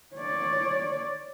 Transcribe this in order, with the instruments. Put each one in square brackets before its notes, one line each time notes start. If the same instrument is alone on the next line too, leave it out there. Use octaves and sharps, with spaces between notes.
[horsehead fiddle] C#5 D5